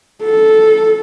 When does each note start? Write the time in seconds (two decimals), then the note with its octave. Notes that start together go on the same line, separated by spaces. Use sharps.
0.23 A4